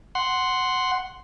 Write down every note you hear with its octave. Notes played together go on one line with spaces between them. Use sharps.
F#5 C6